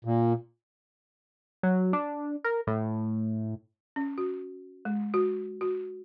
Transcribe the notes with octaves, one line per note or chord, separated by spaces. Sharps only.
A#2
F#3
D4
A#4
A2
C#4
F#4
G#3
F#4
F#4